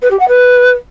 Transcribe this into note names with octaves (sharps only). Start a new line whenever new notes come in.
B4
G4
F#5
B4